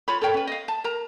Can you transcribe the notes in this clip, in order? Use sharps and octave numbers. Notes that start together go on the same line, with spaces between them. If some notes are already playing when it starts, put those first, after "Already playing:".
F4 C#5 B5
A4 A#4 C#5 G5
C#4 B4
D#5 F5
A5
A#4 A#5